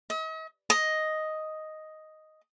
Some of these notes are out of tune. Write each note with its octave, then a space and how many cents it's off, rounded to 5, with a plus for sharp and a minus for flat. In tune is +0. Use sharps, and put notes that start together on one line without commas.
D#5 +45
D#5 +5